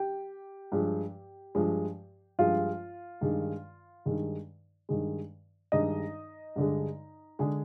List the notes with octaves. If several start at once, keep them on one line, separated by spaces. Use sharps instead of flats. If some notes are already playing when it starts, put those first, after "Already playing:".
Already playing: G4 G5
G2 F3 G#3
G2 F3 G#3
G2 F3 G#3 F4 F5
G2 D#3 G#3
G2 D#3 G#3
G2 D#3 G#3
G2 D#3 G#3 D#4 D#5
G2 D3 G#3
D3 G#3 G#4